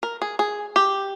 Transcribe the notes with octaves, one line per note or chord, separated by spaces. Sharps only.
A#4
G#4
G#4
G4